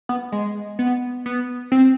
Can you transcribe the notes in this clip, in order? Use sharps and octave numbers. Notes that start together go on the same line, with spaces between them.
B3
G#3
B3
B3
C4